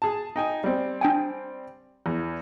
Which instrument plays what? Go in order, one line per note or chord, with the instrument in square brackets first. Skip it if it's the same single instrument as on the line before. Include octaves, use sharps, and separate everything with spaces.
[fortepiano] G#4 A5
D#4 G5 G#5
G3 C4
[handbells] D4 G5 G#5
[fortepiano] E2